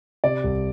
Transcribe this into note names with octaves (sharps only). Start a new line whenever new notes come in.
C3 D5
C2